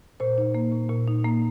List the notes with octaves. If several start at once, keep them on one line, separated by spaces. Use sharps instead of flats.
A#2 C5
D#4
A#3
A#2
A#2
D#4
A#3